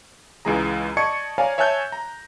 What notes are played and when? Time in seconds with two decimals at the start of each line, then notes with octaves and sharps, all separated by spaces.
0.45 C#2 E3 G#3 G#4 A#5
0.97 D5 D#5 A5 C#6 G#6 C#7
1.38 C#5 D5 F5 G#5 A#5
1.58 C#5 E5 G#5 A5 F#6 G6
1.92 A#5